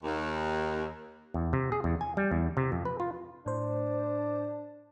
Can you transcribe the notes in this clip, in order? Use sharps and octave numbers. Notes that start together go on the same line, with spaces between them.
D#2
E2
C3
G#4
E2
G#5
G3
E2
C3
F2
B4
F4
A2 D4 C5